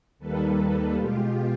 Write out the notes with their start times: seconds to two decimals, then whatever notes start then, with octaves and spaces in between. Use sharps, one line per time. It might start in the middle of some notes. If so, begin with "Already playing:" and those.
0.19 D#2 D#3 G3 A#3 A4 B4
0.96 B2 G#3 F4 G4